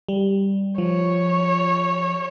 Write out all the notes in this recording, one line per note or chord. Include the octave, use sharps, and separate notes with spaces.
G3
F3 C#5